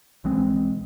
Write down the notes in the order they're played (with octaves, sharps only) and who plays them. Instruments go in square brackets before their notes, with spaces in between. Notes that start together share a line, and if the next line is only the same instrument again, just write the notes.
[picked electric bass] B1 E3 G#3 C4